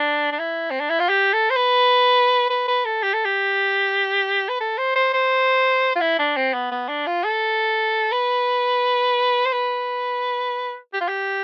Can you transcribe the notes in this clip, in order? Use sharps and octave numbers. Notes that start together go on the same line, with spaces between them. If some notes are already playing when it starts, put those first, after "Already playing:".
Already playing: D4
D4
E4
C4
D4
E4
F4
G4
A4
C5
B4
B4
B4
A4
G4
A4
G4
B4
A4
C5
C5
C5
F4
E4
D4
C4
B3
B3
D4
F4
A4
B4
C5
B4
G4
F4
G4